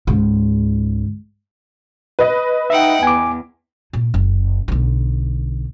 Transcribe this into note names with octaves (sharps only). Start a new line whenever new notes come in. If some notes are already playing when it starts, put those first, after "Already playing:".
C#2 G#2
B4 D#5
D#4 E5 F#5 G5
E2 G#5 D6
A#2
F#1
B1 D3